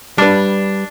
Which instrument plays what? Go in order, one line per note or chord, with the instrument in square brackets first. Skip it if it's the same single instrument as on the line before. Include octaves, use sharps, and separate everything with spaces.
[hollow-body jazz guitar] G3 B4 [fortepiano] D4